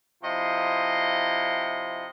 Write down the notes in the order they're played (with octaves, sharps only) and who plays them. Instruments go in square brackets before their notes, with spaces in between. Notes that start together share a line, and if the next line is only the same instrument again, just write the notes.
[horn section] C3 F3 E4 D#5 C6